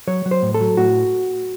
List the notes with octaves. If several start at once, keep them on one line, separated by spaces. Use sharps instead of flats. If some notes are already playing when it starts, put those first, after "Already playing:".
F#3 C#5
F#3
C5
A2
A4
F#3
A2 F#4